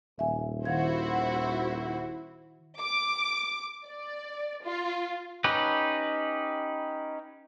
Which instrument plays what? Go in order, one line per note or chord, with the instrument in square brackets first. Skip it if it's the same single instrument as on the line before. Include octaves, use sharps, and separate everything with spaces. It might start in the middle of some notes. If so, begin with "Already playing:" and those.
[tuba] D#1 [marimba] E5 G#5
[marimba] D#3 F5 G#6 [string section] E4 F#4 C5
[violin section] D6
D5
F4
[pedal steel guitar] C#4 D#4 G4 B4